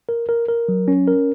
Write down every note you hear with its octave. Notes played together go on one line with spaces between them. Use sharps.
A#4
A#4
A#4
F#3
C#4
A#4